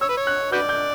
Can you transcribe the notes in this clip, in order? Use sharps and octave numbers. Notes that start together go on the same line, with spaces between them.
C#5 E6
B4
C#5
F#6
F#4 B4 D5 G6
G6